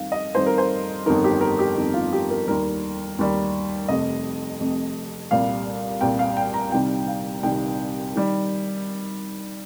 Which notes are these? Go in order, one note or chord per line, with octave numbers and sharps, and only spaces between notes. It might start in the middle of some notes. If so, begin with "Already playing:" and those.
Already playing: F2 D#3 G3 F5
D#5
F2 D#3 G3 C5
A#4
C5
G1 F2 D#3 A#4
G4
A#4
G4
G1 F2 D#3
F4
G4
A#4
D#2 D#3 G3 A#4
D#2 D#3 G3
F1 F2 C3 D#5
F1 F2 C3
C2 A#2 G3 F5
C2 A#2 G3 G5
F5
G5
A#5
C2 C3 D#3 G3 G5
F5
C2 C3 D#3 G3 G5
D#3 G3